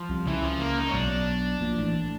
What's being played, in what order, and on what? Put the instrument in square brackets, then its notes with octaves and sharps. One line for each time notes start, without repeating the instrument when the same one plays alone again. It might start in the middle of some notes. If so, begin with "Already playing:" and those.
Already playing: [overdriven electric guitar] F3
[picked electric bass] C2 C3
[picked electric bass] C#2 C#3 [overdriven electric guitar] E3
[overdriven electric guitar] F3
A#3
D#4
C#4
[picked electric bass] B1 B2 [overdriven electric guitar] D4
[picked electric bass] A#1 A#2
A1 A2